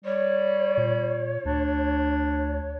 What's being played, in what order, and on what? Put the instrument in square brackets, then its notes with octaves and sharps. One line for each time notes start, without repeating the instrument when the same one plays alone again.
[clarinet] G3 [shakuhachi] C#5
[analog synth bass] A#2
[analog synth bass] D2 [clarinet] D4